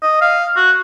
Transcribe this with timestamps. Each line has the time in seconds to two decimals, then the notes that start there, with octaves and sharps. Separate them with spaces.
0.02 D#5
0.21 F5
0.56 F#4